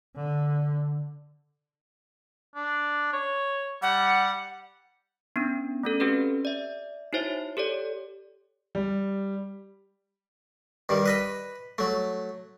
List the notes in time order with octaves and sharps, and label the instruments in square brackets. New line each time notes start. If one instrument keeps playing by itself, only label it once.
[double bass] D3
[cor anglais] D4
C#5
[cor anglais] G3 [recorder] F#5
[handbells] B3 C#4 D4
A3 C#4 A4
C4 C#4 F#4 G4 A4 B4
D5 E5
D#4 E4 F#4 C5 C#5 E5
G4 A4 C#5 D5
[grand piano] G3
[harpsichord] G2 D#3 G3
B4 D#5 B5
F#3 A3